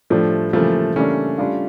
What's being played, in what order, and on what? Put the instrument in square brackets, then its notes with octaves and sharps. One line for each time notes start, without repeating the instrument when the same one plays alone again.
[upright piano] A2 G3 D4 G4 [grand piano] F3 A3
[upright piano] C#3 E3 G3 A#3 [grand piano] F3 A3
[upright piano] C#3 E3 G3 A#3 D4 [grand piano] A3 C#4
[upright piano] G3 D4 F4